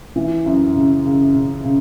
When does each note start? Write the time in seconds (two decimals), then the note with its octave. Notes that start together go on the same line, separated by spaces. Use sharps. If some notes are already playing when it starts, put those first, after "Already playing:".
0.16 E3
0.46 F#2
0.75 C#3
1.05 C#3
1.35 C#3
1.64 C#3